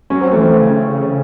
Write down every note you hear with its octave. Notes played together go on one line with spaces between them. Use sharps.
F#3 C#4
C4
E3 A3
C4
C#3
C#3